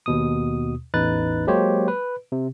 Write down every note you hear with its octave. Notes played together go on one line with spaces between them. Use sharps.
D#2 B2 D#6
A1 E2 D#4 B4 F#6 A6
F#3 G#3 A#3 G4 C5 C#5
B4
C3